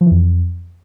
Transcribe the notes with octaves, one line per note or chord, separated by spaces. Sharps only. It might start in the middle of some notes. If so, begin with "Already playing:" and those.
F3
E3
F2